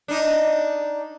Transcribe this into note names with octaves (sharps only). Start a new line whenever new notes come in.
D4 D#4